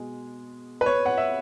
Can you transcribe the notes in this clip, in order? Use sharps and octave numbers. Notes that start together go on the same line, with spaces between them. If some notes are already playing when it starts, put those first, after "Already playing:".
Already playing: B2 G#3
B4
C#5
F#5
E5